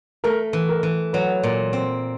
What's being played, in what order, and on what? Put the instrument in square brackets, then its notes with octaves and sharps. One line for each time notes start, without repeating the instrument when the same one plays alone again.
[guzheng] A3 [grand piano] A#4
[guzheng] E3
[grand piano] A#4
[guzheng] E3
[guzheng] F#3 [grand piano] B4
[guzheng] A#2
C4